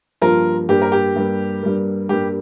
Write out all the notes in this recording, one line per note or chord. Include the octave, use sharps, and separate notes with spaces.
G2 F3 A#3 F4 A#4
G2 G3 A#3 G4
A#4
G4
G2 G3 A#3
G2 G3 A#3
G2 G3 A#3 G4